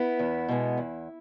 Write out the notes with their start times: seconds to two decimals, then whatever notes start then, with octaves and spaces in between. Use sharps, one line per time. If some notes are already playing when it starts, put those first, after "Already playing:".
Already playing: B3 E4
0.19 E2
0.49 B2 G#3 B3
0.78 E2